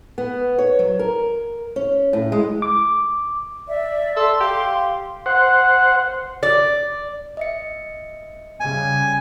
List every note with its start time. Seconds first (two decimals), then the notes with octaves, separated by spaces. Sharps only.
0.18 B3
0.59 C#5
0.79 F#3
0.99 A#4
1.76 C#4
2.13 A2
2.32 G#3
2.62 D6
3.68 D5 E5
4.17 A4 C6
4.41 G4 F5
5.26 C5 F#5
6.43 D5
7.37 D#5 E5 C#7
8.60 C#3 G3 G#5